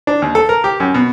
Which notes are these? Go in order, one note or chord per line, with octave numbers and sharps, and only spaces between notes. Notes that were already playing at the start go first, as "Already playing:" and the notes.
D4
D#2
A4
A#4
G4
F#2
B2